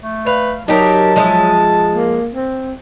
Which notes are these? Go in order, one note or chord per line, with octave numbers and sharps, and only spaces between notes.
A3
B4 F5
F#3 D#4 G4 A#4 A5
F3 G#3 E5
A#3
C4